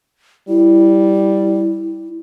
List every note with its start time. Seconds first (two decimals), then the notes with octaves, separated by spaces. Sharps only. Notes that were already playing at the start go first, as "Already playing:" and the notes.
0.48 G3 E4